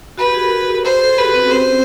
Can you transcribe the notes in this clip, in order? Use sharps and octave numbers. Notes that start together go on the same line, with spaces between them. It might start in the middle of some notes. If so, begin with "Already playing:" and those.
F#4 B4
G4
G#4
A#4
G#4
C5
A4
G#4
G4 B4
F#4
C4
C#4
C4 C5